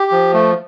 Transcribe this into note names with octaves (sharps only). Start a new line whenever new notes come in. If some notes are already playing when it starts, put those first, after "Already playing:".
Already playing: G4
F3
A3